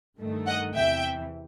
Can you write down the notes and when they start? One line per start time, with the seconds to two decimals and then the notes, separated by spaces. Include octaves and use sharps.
0.18 G2 D#3 A3
0.47 D#5 F#5
0.76 E2 C3 E3 E5 G5